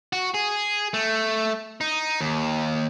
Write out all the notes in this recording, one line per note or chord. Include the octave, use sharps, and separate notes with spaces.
F#4
G#4
A3
D#4
D#2